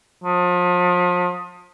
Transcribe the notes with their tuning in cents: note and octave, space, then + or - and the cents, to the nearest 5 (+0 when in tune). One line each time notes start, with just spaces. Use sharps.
F3 +35